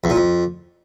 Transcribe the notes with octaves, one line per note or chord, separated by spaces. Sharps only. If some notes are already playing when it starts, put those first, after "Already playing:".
E2
A#2
F2